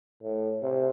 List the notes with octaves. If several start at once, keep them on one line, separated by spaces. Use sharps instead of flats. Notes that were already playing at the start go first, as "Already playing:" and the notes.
A2
C3